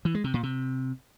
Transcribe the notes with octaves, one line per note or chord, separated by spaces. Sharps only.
E3
G#3
C3
A#2
C3